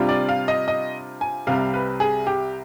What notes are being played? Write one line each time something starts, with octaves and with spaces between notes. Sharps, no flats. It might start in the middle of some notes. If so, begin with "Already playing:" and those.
Already playing: C3 G3 D4 F4
D5
F5
D#5
D#5
G#5
C2 C3 G3 F5
B4
G#4
G4